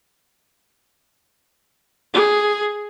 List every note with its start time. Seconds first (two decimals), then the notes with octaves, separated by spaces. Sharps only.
2.14 G#4